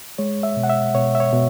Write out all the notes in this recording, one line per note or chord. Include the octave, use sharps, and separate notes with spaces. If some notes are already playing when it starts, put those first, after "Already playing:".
G#3 C#5
E5
B2
F#5
E5
B2 C#5
E5
C#5
B2